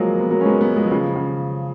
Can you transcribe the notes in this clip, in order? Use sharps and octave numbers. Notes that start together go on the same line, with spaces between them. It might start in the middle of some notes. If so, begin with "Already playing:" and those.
Already playing: F3 F#3 G#3 A#3
B3
F#3 A#3
C#4
G#3 B3
G#3 B3
F3 G#3
F#3
C#3 F3
C#3